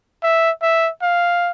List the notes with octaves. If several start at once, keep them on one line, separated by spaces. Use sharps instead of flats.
E5
E5
F5